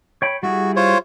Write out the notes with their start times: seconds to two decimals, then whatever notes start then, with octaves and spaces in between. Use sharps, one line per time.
0.22 C#5 G5 B5
0.43 G3 E4 F#4 G#4
0.76 F4 C5 C#5